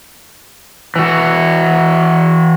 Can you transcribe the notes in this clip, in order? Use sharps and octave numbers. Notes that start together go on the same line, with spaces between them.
E3 F#4